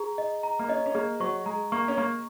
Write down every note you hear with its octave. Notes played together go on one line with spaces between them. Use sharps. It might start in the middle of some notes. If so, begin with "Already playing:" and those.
Already playing: G#4 A#5
D#5
A#5
A#3
C#4 D#5
C#4
A#3 G#4
F#3 C#6
G#3 A#5
A#3 C#6
C#4
A#3 C#6